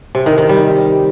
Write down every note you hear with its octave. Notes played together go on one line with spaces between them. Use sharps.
C3
D#3
D#3
G3